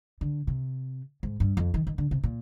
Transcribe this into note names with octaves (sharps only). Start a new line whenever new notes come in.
D3
C3
G#2
G2
F2
D#3
D#3
D3
C3
A#2